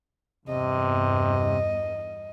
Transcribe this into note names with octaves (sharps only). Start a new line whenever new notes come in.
E2 G2 C3 D#5